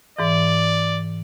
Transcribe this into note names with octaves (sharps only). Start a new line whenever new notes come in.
G#2 E3 D5